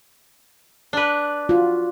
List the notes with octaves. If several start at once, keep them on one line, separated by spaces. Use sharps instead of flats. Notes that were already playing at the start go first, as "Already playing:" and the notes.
D4 B4
F4 F#4